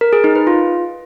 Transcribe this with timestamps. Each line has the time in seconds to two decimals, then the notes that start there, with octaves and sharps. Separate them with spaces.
0.01 A#4
0.13 G#4
0.24 D#4
0.35 B4
0.47 F4